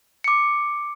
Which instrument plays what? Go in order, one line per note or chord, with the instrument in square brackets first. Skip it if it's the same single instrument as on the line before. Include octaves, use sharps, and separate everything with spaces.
[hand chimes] D6 C#7